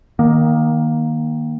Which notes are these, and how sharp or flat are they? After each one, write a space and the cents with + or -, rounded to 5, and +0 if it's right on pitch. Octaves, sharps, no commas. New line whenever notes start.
D#3 +0 A#3 +15